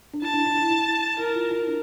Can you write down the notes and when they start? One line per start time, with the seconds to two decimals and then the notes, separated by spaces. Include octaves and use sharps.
0.14 D4
0.22 E4 A5
0.34 D4
0.46 E4
0.58 E4
0.70 E4
1.19 E4 A#4
1.35 F4
1.51 E4
1.68 D4